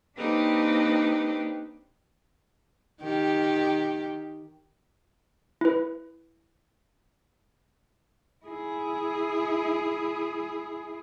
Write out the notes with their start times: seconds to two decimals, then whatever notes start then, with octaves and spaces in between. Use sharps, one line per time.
0.17 A#3 C4 D4 D#4 G4 B4
3.02 D#3 G4
5.61 E4 B4
8.46 E4 G#4